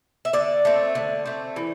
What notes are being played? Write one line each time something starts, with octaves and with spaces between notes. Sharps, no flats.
E5
D3 D5
A3 C4
D3
A3 C4
E3